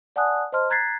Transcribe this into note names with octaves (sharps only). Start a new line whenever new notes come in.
D5 F#5 G#5 A5 D#6 F#6
C5 D#5 A5 C6 F6
A#5 F#6 G#6 A6 B6 C7